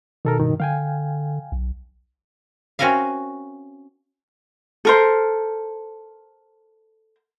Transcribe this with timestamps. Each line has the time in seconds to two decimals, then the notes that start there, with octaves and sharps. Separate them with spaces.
0.25 B2 D#3 A4 A#4
0.39 G2 D#3
0.60 D3 F5 G5 G#5
1.52 B1
2.79 C4 C#4 F#4 A#4 E5 F5
4.85 A4 A#4 C5